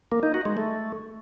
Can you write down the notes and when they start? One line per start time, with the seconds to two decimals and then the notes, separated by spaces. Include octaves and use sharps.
0.12 A#3
0.23 D#4
0.34 F#4
0.45 G#3
0.57 A3